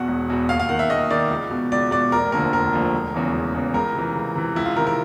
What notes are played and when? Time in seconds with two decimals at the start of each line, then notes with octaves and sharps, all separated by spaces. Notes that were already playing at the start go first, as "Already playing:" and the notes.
Already playing: E2 B2 F#5
0.08 E1
0.30 E2 B2
0.49 D#2 F5
0.59 F5
0.69 D#3 F#5
0.79 E5
0.90 D#2 D#5
1.11 D#3 D5
1.31 C#2
1.51 B2
1.72 C#2 D5
1.91 B2 D5
2.12 F1 A#4
2.32 D#2 D3 F3 A#4
2.52 F1 A#4
2.73 D#2 D3 F3
2.93 E1
3.14 E2 C#3 E3
3.34 E1
3.54 E2 C#3 E3
3.74 C#2 A#4
3.95 C3 E3
4.15 C#2
4.35 C3 E3
4.56 C#2 E4
4.66 F4
4.76 C3 D#3 A#4
4.87 A#4